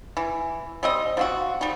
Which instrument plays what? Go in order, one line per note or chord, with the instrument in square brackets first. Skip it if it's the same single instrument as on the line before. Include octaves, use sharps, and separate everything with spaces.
[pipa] E3
G3 C4 D#5
F3 C4 F#4
G3 D#4